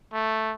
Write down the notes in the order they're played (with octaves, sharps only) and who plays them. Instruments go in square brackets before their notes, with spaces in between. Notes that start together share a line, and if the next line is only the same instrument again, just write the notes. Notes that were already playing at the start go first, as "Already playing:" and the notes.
[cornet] A3